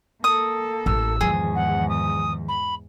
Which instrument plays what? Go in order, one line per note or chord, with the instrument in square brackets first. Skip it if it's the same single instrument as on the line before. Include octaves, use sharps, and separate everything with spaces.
[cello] A#3 A4 [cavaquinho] D#6
[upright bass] A1 [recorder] E6
[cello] E2 G#2 [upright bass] D#3 F3 [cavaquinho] G#4
[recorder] F#5
D#6
B5